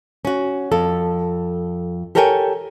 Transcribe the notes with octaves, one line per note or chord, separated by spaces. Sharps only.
C#4 F#4
F2 A4
G4 A4 A#4 C#5 G5 G#5